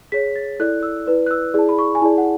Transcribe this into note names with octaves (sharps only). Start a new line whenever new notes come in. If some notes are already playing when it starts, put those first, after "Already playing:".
G#4 C#5 B6
A6
E4 A4 D5 F#6
E6
E4 B4 D5
F#6
E6
E4 G#4 D5 A5
B5
C#6
G#5
E4 G#4 D5 A5
F#5